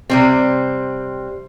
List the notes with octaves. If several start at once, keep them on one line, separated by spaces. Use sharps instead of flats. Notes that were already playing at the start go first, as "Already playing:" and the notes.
C3 G3 C4